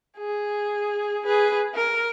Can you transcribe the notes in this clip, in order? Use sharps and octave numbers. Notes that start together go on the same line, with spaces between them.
G#4
G#4 B4
A#4